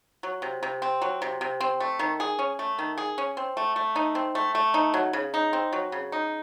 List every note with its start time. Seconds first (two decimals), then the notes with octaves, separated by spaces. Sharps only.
0.23 F#3
0.42 C3
0.63 C3
0.82 C4
1.02 F#3
1.22 C3
1.41 C3
1.61 C4
1.80 A3
1.99 D#3
2.20 G#4
2.39 C#4
2.59 A3
2.79 D#3
2.98 G#4
3.18 C#4
3.37 C4
3.57 A3
3.76 A3
3.96 D#4
4.15 C4
4.35 A3
4.55 A3
4.74 D#4
4.94 F#3
5.13 C#3
5.34 D#4
5.53 C4
5.72 F#3
5.92 C#3
6.12 D#4